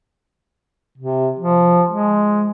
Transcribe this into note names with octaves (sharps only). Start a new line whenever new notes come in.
C3
F3
G#3